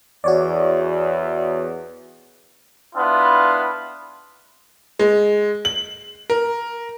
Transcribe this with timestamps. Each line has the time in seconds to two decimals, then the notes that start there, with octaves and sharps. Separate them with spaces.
0.24 E2 F#4 C#5 D5
2.95 B3 D4 E4 F4
4.99 G#3
5.65 F#7
6.30 A#4